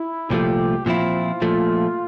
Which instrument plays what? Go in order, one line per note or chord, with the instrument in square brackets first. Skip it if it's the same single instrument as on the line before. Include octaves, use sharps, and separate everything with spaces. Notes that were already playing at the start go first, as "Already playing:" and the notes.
Already playing: [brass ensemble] E4
[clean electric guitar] C2 A#2 F3 A3 [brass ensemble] G4
[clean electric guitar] A#2 F3 C4 E4 [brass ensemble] F4
[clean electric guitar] A#2 F3 A3